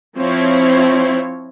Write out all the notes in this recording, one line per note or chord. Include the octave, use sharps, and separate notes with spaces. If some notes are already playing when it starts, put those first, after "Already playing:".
F3 C4 E4 C#5